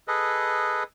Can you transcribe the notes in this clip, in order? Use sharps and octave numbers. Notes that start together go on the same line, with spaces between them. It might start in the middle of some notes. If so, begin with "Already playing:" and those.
G#4 A4 B4 D#5